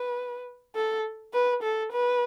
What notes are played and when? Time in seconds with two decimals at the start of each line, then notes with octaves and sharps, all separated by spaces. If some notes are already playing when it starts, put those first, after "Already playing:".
Already playing: B4
0.76 A4
1.33 B4
1.63 A4
1.92 B4